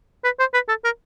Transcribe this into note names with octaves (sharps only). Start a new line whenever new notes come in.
B4
C5
B4
A4
A#4